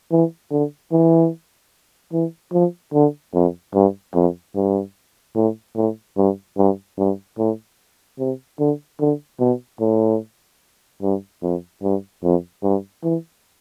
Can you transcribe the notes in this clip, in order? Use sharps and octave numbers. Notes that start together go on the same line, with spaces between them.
E3
D3
E3
E3
F3
D3
F2
G2
F2
G2
A2
A2
G2
G2
G2
A2
C3
D3
D3
B2
A2
G2
F2
G2
F2
G2
E3